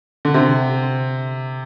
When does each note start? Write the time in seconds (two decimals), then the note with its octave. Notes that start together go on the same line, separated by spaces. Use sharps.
0.25 D3
0.34 C3